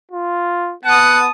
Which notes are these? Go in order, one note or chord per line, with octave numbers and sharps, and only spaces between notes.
F4
B3 F#5 A5 D#6